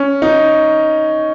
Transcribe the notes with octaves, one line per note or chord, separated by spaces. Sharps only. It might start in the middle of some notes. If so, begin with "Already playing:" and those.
Already playing: C#4
D#4